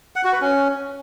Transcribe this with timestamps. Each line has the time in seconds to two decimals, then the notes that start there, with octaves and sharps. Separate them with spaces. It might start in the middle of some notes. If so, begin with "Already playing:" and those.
0.16 F#5
0.24 F#4
0.33 B4
0.41 C#4